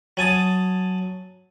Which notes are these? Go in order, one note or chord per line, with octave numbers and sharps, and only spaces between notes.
F#3 G#5 A5 D#6